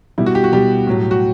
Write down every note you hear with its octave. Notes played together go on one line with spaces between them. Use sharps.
B2 G3 E4
F#4
G4
F#4
B2 G3 G4
A2 F#3
F#4